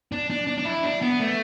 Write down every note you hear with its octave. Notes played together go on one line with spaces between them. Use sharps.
D4
D4
D4
D4
E4
D4
B3
A3